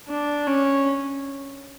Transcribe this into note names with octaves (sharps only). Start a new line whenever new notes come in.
D4
C#4